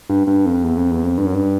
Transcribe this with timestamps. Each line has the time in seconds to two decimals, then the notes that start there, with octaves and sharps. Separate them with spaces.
0.10 G2
0.27 G2
0.46 F2
0.64 E2
0.77 F2
0.91 E2
1.04 F2
1.18 G2
1.26 F#2
1.34 G2